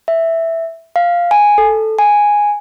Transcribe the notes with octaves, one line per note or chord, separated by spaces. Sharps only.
E5
F5
G#5
A4
G#5